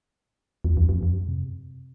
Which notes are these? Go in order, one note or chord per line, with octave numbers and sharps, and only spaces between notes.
E2
F2
F2
F2
F#2
C3